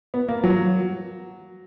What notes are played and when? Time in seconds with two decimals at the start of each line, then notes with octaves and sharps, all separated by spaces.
0.14 B3
0.28 A#3
0.44 F#3